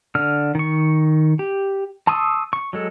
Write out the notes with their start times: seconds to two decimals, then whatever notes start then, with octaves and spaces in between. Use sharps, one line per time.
0.15 D3 F6
0.55 D#3 C#6
1.39 G4
2.07 A5 C6 C#6 D#6 E6
2.53 C#6
2.73 F#3 G#3 A4